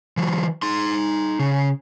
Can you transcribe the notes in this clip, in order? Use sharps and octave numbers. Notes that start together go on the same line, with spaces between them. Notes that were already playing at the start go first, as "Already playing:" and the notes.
E3 F#3
D#4 C6
C#3